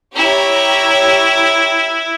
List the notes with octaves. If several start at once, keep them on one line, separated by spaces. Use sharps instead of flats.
E4 G4 C#5 A#5